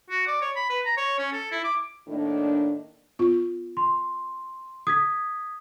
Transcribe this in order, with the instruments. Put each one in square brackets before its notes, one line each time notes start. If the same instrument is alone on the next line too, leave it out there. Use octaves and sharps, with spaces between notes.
[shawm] F#4
D5
C#5
B5
B4
A#5
C#5
C#4
A4
E4
D6
[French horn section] A2 D#3 A#3 D4
[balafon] B3 F4
[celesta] C6
D#6 G#6 B6